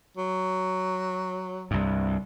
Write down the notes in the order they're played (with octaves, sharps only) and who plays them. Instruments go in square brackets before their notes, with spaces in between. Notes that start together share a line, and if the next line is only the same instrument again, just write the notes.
[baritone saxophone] F#3
[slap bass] C2 G2